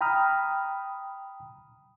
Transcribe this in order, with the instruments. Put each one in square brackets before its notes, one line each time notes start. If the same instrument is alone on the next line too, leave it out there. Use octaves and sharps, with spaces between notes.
[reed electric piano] G5 A#5 B5 D#6 F6